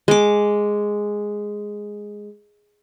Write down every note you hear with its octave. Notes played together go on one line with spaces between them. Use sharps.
G#3 D6